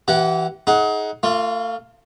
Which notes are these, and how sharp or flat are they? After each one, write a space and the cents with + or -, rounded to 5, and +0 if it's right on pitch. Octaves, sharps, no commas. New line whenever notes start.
E3 +0 G4 -35 F#5 +0
D#4 +30 G#4 +30 F#5 +0
A3 +40 F4 +0